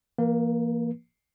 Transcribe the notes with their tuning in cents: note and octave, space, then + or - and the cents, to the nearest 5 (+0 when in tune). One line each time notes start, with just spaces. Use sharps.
E3 +40 A#3 +0 B4 -45